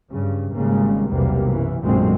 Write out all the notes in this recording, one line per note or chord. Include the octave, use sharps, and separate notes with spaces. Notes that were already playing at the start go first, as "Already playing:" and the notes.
G2 C#3
G#1 C#3 G3 G#3 A#3
B1 E2 C3 G3 A#3 B3
F#2 E3
A#1 F#2 A2 D3 G#3 C4